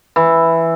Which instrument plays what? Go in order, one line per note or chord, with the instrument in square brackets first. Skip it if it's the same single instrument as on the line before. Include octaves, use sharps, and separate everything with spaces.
[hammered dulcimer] E3